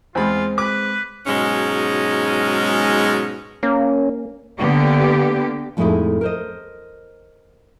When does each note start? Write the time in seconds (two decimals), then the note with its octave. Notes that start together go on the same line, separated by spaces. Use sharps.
0.15 E2 G#3 C4 F4 B5
0.58 B4 D6
1.27 G#2 B2 F#3 G#3 C#4 D#4
3.63 A#3 C#4
4.59 D3 A#3 B3 G4
5.77 F2 A2 G#3 A3 D#4 E4
6.21 A#4 C5 D#5